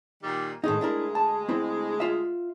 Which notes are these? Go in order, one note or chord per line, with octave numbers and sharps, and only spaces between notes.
A#2 D#3 G3
D2 A2 D#3 G#3 D#4
D4 E4 A#4
A5
C4 E4
F4 E5